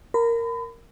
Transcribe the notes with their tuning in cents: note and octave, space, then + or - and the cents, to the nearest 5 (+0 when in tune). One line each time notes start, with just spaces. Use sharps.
A#4 -5 B5 +35